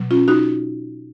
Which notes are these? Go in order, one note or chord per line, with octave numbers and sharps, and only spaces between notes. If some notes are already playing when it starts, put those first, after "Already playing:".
Already playing: B2 F#3
C#4 F4
D#4 F#4